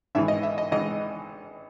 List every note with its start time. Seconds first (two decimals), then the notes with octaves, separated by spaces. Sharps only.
0.15 G#1 G#2 E3 E5
0.28 D#5
0.43 E5
0.58 D#5
0.72 G#1 G#2 E3 D#5